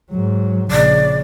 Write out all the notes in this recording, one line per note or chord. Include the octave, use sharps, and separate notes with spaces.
G#2 F#3
A#1 C#3 D5